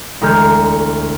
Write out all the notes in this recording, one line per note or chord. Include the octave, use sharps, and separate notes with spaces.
E1 D2 G#3 A#5 F6 G6